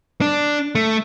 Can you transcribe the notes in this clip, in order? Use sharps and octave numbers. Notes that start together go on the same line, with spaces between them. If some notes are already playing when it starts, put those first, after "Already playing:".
D4
A3